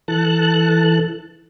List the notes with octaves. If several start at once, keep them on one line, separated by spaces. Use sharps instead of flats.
E3 A4 A5 F#6